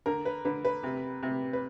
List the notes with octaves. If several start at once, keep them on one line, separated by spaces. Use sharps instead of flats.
D3 A#4
B4
D3 B4
B4
C3
C3
B4